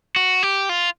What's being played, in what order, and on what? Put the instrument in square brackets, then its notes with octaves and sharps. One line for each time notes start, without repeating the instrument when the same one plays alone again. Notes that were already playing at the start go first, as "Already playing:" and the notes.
[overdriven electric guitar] F#4
G4
F4